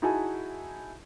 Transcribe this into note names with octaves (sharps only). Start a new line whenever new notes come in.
D#4 E4 F#4 G#4 G#5 A5